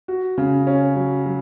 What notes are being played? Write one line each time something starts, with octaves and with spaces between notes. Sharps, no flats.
F#4
C#3
C#4
F#3
F#3